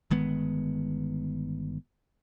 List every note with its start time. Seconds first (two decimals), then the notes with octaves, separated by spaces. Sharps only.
0.11 G1 D#3 G#3 B3